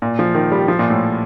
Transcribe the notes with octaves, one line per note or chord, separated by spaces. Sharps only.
A#2
F3
D#3
G3
F3
A#2
A2